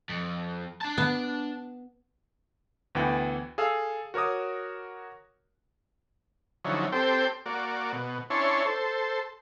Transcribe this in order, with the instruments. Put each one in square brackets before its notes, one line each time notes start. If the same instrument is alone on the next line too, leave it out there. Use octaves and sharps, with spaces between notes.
[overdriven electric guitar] F2
D4 A5
[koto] B3
[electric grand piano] D2 E3 B3 F#5 G5
G#4 A4 F5 E6
F#4 A#4 C#5 D6 D#6
[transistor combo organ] D3 F3 F#3 C#4 D#4 E4
C4 G4 A4 C5 G5
A#3 F#4 D5
B2
C#4 D4 E4 C#5 A5 C6
A4 C5